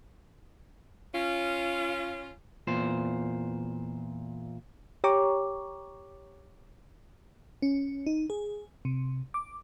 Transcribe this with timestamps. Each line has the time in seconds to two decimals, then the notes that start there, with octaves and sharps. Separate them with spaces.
1.14 C#4 F4
2.67 E2 A#2 C5
5.04 G4 C#5 G5 A#5 C#6 D6
7.62 C#4
8.06 D#4
8.30 G#4
8.85 C3
9.34 D6